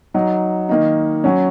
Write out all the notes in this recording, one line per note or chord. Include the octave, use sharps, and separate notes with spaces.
F#3 D#4
D#3 A#3 D#4
F#3 C#4